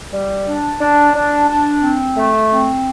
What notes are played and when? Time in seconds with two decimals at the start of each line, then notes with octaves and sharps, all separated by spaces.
0.12 G3
0.46 D4
0.79 D4
1.13 D4
1.48 D4
1.82 C4
2.16 A3
2.51 C4